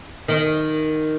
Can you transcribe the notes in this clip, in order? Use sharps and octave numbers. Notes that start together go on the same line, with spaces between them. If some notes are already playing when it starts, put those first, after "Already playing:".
D#3